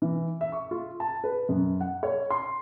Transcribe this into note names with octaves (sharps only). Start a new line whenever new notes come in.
E3
E5
C#6
F4
A5
B4
F#2
F#5
C#5
C6